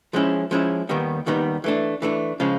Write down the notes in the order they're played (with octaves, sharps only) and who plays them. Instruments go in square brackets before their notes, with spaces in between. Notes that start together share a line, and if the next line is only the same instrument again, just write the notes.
[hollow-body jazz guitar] F3 G#3 C#4 E4
F3 G#3 C#4 E4
D#2 D#3 G3 B3 D#4
D#2 D#3 G3 B3 D#4
E3 A3 D4
E3 A3 D4
C#3 F3 G#3 C#4